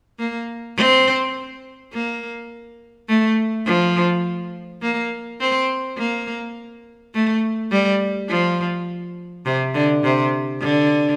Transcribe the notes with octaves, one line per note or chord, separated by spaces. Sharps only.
A#3
C4
A#3
A3
F3
A#3
C4
A#3
A3
G3
F3
C3
D3
C3
D3